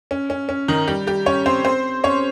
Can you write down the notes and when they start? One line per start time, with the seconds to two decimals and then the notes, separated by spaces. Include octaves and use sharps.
0.11 C#4
0.30 C#4
0.49 C#4
0.68 D#3 D#4
0.88 G3 G4
1.07 G3 G4
1.26 C#4 C#5
1.46 C4 C5
1.65 C4 C5
2.04 C#4 C#5